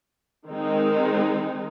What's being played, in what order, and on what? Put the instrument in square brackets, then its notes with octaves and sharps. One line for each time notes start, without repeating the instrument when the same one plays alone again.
[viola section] D#3 G#3 C4 D#4